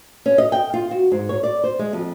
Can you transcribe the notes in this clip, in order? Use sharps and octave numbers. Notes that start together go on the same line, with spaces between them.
C#4
D#5
G5
F4
F#4
G#2
C#5
D5
C5
G#3
F2